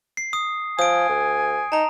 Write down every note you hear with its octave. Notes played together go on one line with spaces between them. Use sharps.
C7
D#6
F3 G#5 D#6 D7
D2
D#4 A5 A#5